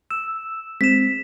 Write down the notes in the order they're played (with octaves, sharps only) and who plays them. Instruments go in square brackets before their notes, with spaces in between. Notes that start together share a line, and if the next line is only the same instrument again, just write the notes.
[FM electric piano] E6 [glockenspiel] E7
[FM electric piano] G#3 C4 [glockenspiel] B6 E7